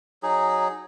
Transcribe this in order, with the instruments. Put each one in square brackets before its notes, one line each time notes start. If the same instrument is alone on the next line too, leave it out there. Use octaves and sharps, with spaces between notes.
[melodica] F#3 D#4 G#4